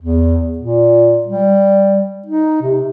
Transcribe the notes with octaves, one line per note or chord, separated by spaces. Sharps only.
E2
A#2
G3
D#4
C3